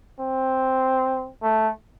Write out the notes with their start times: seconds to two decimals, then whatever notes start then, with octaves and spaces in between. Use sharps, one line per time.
0.20 C4
1.43 A3